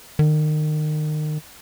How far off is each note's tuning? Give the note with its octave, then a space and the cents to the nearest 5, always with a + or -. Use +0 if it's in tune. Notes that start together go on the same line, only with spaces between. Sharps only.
D#3 -30